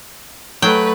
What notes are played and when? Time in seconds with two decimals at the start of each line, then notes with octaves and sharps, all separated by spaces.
0.62 F#3 A3 B4 G5